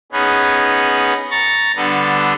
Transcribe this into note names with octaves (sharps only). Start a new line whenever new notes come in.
B3 C#4 D#4 G#4 B4
A#5 C#6 A6
D3 G3 B3 D4 A4 B4